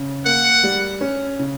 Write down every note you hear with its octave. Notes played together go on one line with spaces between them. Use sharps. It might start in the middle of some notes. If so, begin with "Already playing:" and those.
Already playing: C#3
A#3 F#5
G3
C#4
C#3